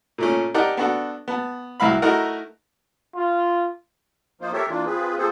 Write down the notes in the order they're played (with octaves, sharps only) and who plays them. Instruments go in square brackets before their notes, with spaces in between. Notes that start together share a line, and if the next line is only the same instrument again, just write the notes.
[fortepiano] A#2 A3 C#4
D#4 G4 A#4 D5 F#5 A5
B3 D4 F#4 A4
B3 A5
C2 F#3 E4 F5 B5
A3 D#4 E4 F#4 A#4
[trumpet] F4
[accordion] F3 A#3 D#4 F4 C5
G4 A4 A#4 C#5 E5
E3 A#3 D4 F4
C4 F4 G#4 B4
A#3 C4 F4 G#4 A4 C5